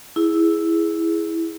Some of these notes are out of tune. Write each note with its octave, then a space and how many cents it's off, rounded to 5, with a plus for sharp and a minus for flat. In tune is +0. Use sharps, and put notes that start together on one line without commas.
E4 +0 G#4 +0